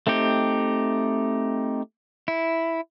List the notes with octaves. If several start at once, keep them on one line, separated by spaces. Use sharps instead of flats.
A3 C4 D#4 G4
E4